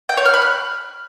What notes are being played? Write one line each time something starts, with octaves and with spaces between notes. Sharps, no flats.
G5
C#5
F6
B5
F#6